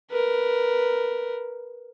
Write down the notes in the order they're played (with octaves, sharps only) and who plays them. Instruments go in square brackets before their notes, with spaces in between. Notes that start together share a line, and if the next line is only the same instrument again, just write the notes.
[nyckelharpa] A#4 B4